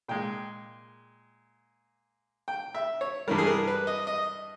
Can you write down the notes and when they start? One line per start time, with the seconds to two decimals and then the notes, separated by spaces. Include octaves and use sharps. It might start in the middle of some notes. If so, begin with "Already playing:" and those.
0.08 A#2 G#3 G5
2.48 G5
2.75 E5
3.01 C#5
3.28 G2 E3 G3 A#4
3.38 G#4
3.47 A#4
3.67 B4
3.87 D#5
4.07 D#5